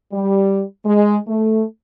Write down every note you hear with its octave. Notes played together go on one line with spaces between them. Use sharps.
G3
G#3
A3